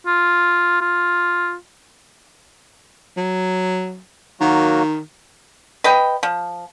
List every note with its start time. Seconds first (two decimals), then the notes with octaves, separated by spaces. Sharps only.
0.06 F4
0.81 F4
3.17 F#3
4.41 D#3 F#3 A#3 F#4
5.84 B4 D#5 G5
6.23 F3